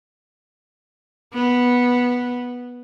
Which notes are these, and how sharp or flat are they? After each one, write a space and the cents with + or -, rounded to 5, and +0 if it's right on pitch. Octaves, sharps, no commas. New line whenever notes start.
B3 -10